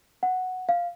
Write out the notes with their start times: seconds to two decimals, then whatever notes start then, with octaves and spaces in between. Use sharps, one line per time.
0.23 F#5
0.69 F5